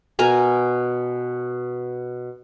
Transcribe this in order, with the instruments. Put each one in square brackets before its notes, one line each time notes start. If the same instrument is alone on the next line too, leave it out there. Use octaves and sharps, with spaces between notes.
[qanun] B2 A#4 G#5 A#5